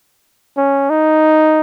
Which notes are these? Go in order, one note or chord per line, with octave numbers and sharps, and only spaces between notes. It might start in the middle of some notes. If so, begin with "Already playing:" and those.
C#4
D#4